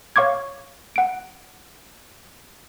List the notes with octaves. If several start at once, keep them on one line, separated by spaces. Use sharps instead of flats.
C#5 F5 C#6 D6 G#6
F#5 D7